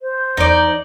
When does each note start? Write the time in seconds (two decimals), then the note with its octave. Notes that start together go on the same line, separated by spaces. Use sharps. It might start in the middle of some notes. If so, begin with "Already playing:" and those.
0.01 C5
0.37 E2 D#4 D5